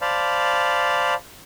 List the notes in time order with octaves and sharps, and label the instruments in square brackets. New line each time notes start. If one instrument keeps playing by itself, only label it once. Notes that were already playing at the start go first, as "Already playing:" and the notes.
[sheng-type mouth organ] C5 D5 F5 A5 B5